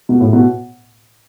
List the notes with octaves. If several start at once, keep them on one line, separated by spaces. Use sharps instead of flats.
B2
A2
B2